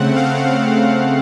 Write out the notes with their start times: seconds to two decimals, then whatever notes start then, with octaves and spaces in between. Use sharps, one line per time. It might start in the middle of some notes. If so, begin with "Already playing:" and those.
Already playing: C#3 A3 C4 F#5
0.16 F5